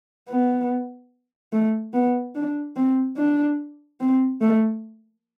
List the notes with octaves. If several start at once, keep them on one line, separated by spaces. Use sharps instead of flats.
B3
A3
B3
D4
C4
D4
C4
A3